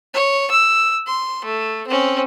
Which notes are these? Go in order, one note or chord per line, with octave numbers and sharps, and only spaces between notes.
C#5
E6
C6
A3
C4 C#4